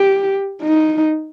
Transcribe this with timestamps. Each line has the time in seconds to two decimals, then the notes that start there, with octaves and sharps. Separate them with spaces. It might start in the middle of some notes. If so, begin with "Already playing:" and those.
Already playing: G4
0.62 D#4